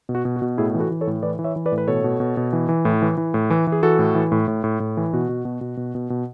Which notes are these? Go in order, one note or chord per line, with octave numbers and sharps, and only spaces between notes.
B2
F#4
B2
F#4
B2
A2 E4 G#4
E3
F#4 A4
E3
A4 C#5
A2
E3 B4 D5
E3
C#5 E5
E3
B4 D5
A2
B4
B2 A4 C#5
B2
B2
B2
E3
E3
A2
E3
E3
A2
E3
E3
G#4
E3 F#4 A4
A2
E3
A2
A2
A2
A2
E3
B2 F#4
B2
B2
B2
B2
B2
B2